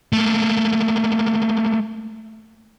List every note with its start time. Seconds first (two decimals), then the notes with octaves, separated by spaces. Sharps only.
0.13 A3 A#3